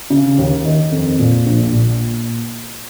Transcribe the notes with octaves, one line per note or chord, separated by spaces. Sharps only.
C#3
D#2
D#3
F2
A#2
A#1
A#2